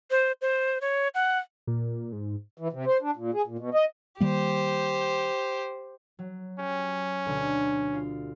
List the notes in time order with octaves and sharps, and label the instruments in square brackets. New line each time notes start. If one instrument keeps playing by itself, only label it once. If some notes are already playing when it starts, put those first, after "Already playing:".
[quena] C5
C5
C#5
F#5
[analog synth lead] A#2
G#2
[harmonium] E3
C3
C5
D4
A#2
G#4
A#2
B2
D#5
[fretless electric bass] D#3 G3 A#3 [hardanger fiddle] G4 C5
[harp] F#3
[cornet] C#4 [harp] G4
[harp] D2 B2 D3
F4